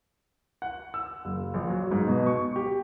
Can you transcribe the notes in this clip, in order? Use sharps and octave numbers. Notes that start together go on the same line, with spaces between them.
F#5
E6
F#1
A#1
F#3
G#2
B2
C#6
G4